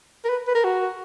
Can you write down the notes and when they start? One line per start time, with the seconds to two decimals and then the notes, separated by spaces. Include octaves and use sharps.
0.24 A#4
0.29 B4
0.47 B4
0.55 A#4
0.64 F#4